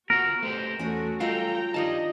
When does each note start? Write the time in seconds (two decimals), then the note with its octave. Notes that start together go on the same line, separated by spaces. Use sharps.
0.10 B3 F4 F#4 A#4 F#5
0.42 A3 B3 G4 C5
0.79 E2 A3 C#4 F#4 D#5 A#5
1.20 F#3 G3 F4 A4 D#5 F5 G5 A#5
1.74 D#3 F3 D4 G4 D#5 A5